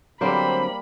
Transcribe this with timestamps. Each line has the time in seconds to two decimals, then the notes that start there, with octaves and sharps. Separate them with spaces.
0.21 D3 F#3 G3 A#3 C4 C5 B5